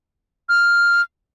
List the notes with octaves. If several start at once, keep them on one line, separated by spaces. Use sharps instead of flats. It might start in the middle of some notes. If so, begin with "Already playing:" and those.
F6